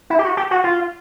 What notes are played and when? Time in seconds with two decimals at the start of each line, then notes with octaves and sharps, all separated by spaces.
0.10 E4
0.19 G4
0.24 F#4
0.37 G4
0.51 F#4
0.64 F4